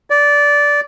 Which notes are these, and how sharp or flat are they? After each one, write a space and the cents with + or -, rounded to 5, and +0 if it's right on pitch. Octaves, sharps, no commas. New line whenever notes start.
D5 -15